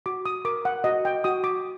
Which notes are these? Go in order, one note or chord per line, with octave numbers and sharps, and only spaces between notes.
F#4 D6
D#6
A#4 D6
F#5
F#4 D#5
G5
F#4 D#6
D6